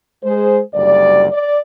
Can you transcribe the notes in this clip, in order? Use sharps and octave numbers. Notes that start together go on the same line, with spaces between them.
G#3 G#4 C5
F#1 D2 G3 D5
D5